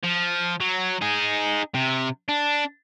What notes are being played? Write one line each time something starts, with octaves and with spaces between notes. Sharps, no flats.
F3
F#3
D#4 G#4
C3
D4